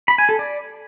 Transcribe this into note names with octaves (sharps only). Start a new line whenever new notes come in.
B5
G#5
A4
D5